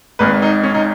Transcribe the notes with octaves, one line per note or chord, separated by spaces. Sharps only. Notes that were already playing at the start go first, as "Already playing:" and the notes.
G#1 G#2 D#3 B4
D#4
C#4
D#4